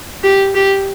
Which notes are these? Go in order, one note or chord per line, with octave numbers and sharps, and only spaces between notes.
G4
G4